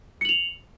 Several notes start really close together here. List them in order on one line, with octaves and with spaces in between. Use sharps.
C#7 F#7 F7